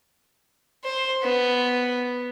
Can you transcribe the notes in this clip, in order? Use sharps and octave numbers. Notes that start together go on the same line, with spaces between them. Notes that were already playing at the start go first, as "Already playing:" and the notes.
C5
B3